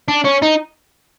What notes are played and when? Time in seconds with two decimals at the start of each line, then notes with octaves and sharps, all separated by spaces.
0.08 D4
0.25 C#4
0.42 D#4